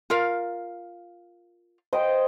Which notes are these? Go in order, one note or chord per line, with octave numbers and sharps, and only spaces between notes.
F4 A#4 F5
C5 D#5 G5